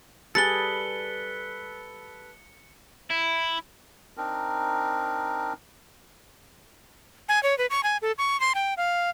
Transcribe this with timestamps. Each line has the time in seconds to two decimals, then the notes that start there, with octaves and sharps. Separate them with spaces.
0.35 G3 G#4 A4 B4 A6 C#7 G7
3.11 E4
4.17 C4 D4 D#4 A#4
7.29 G#5
7.43 C#5
7.58 B4
7.70 C#6
7.83 G#5
8.02 A4
8.18 C#6
8.40 C6
8.55 G5
8.77 F5